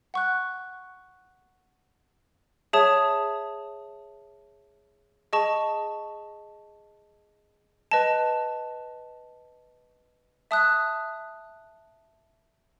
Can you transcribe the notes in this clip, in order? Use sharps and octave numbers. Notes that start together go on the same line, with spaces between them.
F#5 C#6 F#6
G#4 C#5 E5 A5 D#6
G#4 D#5 A5 C#6
B4 D#5 A5
E5 A5 D#6 F#6